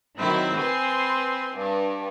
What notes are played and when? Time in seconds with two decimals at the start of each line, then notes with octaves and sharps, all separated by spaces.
0.19 D#3 F#3 C4 E4
0.59 B4 G#5 C6
1.53 G2